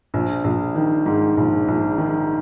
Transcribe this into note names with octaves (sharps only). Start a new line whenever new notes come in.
A#1
A#1
D#3
G#2
A#1
A#1
D#3